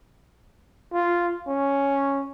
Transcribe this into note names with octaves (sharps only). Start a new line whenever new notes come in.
F4
C#4